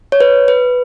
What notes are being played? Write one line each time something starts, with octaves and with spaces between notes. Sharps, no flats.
C#5
B4
B4